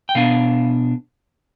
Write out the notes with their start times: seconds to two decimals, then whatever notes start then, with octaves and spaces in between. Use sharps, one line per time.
0.09 G5
0.15 B2 B3 D4 F5